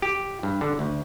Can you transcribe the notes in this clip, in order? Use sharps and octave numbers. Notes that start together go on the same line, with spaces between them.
G4
G2
D3
D2